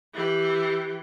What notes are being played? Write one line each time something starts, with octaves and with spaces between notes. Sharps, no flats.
E3 G4